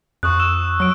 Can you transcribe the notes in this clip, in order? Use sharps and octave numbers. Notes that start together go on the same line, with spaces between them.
F2 C#6 D#6 F#6
E6 E7
F#3 E6 D7